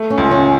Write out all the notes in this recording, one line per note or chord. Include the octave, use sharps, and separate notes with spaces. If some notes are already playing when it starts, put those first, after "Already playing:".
Already playing: A3
C#4
C#2
C#4